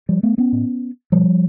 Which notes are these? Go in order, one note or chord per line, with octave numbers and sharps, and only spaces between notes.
F3 G3
A3 B3
B3 C#4
A2
B2 F3 G3